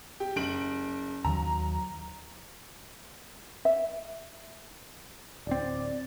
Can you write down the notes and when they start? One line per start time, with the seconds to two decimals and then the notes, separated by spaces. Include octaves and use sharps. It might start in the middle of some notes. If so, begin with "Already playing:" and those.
0.20 G4
0.36 F#1 D7 F#7
1.25 D#2 D#3 F#3 A#5
3.65 E5
5.47 D1 C4 D5